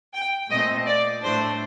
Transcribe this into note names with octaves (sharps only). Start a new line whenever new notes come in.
G5
A#2 A3 C4 D#5
D5
A2 A3 D4 C5